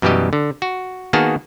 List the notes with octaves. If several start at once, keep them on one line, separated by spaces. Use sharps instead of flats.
F#2 B2 E3 G3 G4 D#5
D3
F#4
D#3 A#3 B3 F#4 G#4 A5